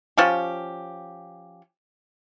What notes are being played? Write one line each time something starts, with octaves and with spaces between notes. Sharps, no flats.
F3 C#4 G4